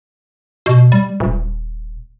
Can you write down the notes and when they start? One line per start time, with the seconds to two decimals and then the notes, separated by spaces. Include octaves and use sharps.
0.66 B2
0.92 G3
1.20 D#1